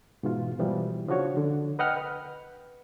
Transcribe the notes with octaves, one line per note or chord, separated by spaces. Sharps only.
G#2 B2 E3 F4
B2 E3 F3 G3
C#3 F3 D4 F#4 C#5
D3
B4 D#5 F#5 G5 F6
B4